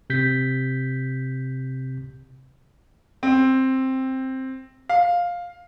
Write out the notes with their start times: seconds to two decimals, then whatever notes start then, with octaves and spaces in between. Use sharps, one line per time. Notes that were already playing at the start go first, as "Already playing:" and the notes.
0.10 C3 G6 B6
3.23 C4
4.89 F5